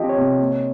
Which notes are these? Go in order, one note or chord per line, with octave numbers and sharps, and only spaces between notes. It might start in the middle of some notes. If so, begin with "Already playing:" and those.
Already playing: F3 C4 G4 D#5
C#5
C3
A#3